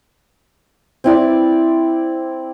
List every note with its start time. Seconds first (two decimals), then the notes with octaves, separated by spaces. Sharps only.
1.04 C4 E4 D5